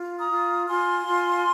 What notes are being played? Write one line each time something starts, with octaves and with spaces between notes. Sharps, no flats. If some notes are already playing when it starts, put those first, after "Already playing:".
Already playing: F4
A#5 D#6
F4
F4 G#5 C6
F4